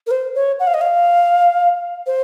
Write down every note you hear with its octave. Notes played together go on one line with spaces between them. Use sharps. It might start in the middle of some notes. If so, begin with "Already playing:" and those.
A#4
C5
C#5
F#5
F5
D#5
F5
C5